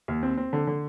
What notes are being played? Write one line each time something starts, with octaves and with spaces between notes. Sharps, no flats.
D#2
C4
C4
D3
D3